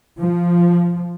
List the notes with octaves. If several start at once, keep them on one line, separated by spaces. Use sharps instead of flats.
F3